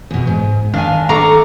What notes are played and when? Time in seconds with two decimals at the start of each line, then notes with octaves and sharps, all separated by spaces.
0.11 E2 B2
0.27 G#2
0.74 D#3 D4 D5 F5 G#5
1.09 A3 A4 F5 A#5 C#6 D6